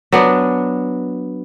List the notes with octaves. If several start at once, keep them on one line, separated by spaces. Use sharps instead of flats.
F#3 B3 D4